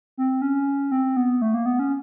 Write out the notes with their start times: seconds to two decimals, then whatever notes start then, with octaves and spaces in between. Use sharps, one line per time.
0.18 C4
0.42 C#4
0.92 C4
1.17 B3
1.42 A3
1.54 A#3
1.66 B3
1.79 C#4